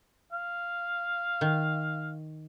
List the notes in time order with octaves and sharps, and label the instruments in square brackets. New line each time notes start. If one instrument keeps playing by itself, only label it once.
[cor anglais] F5
[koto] D#3